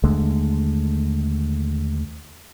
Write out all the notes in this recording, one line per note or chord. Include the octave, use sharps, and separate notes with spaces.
D#2 D3 G#3 A3